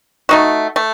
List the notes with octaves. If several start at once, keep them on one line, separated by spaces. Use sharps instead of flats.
A3 D#4 F#4
A3